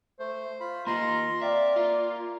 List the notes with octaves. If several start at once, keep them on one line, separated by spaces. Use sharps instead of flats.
A3 C5
F4 B5
A#3 F4 D#5 A#5 C6
C4 D5 E5 F5
A#3 F4